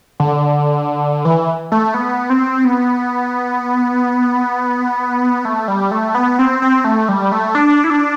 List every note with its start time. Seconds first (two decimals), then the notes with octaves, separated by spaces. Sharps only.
0.20 D3
1.25 E3
1.72 A3
1.94 B3
2.30 C4
2.65 B3
5.45 A3
5.68 G3
5.91 A3
6.15 B3
6.39 C4
6.62 C4
6.84 A3
7.09 G3
7.32 A3
7.55 D4
7.84 E4
7.90 D4